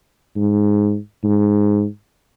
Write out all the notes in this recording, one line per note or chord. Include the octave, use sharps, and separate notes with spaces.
G#2
G#2